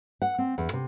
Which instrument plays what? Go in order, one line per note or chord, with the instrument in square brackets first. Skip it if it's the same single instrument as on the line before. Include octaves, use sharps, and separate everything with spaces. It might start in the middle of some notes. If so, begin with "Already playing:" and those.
[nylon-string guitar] F#5
C4
E2
C3